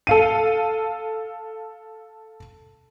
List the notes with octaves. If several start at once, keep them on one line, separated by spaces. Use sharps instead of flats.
A4 F5 D#7